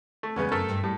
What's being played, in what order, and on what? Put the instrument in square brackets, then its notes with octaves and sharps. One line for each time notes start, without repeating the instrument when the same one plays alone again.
[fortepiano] A3
[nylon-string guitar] E2 G#3 [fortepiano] C#3 B3 C#4
[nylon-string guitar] F#2 [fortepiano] A3 A4 A#4
[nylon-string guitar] G2
[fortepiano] A2 [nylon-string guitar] G3